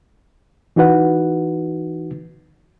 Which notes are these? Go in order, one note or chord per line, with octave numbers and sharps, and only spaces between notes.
E3 D#4 F#4 B4 F#5